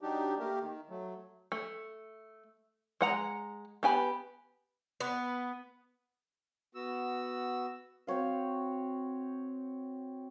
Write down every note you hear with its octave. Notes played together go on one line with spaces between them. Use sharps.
F#3 D4 D#4 G4
A3 A#3 G4 A#4
D#3
F#3 A3
A3
G#3 F#5 A#5
B3 G4 G#5 B5
B3
B3 F#4 E6
C4 F#4 C#5 F5